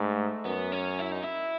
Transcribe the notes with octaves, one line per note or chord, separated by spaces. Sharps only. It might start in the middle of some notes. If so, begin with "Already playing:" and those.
Already playing: G#2 A3
F#2 B3
C#4
E4
D#4
E4